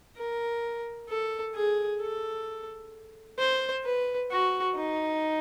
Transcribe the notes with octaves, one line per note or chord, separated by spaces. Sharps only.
A#4
A4
G#4
A4
C5
B4
F#4
D#4